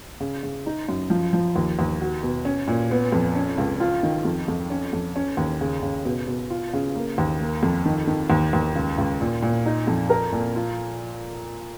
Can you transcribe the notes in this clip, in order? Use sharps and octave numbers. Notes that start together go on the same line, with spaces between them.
C#3
C#3
D#4
F#2
F3
F3
D#2
D#2
F#4
B2
C#4
A#2
B3
F2
C#4
C#2
F4
D#3
F2
F2
C#4
F2
C#4
D#2
C#3
C#3
B2
B2
F4
C#3
A#3
D#2
A#3
F2
D#3
D#3
D#2
D#2
C#2
C#2
A#2
A#2
D#4
F2
A#4
A#2
F4